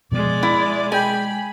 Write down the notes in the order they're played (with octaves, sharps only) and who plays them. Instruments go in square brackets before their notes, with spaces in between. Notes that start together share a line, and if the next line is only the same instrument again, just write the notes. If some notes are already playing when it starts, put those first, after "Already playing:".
[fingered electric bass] B2 F3 B3 [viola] G#3 D5
[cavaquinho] E4
[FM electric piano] G#3 G5 [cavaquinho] G#5 [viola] B5